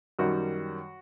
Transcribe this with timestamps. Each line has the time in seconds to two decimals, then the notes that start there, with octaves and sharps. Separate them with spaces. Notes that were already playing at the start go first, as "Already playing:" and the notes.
0.19 F#2 D#3 G3 F#4